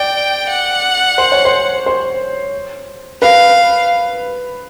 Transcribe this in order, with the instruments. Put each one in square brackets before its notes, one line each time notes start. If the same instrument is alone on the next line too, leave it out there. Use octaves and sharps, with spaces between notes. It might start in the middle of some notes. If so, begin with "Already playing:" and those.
Already playing: [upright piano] D5 [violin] G5
[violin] F#5
[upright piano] C5
C#5
C5
C5
[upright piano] B4 [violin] F5